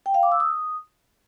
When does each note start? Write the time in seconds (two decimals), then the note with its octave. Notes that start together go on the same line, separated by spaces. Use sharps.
0.06 G5
0.14 F5
0.23 D6
0.32 E6
0.40 D#6